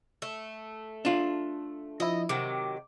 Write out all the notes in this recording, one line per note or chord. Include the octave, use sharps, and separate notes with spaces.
A3
D4 F4
F3 E4 D#5
C3 D#3 F#3 D6